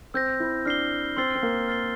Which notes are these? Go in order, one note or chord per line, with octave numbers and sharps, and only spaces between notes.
C4 E6 G6 A#6
E4
D4 F6 C7 G7
C4 C6 E6 A6 C7 G7
C4
A#3
F6 A6 C7 G7